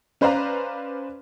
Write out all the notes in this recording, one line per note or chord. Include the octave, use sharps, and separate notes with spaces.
C#4 B4 C5 D5 F5 A#5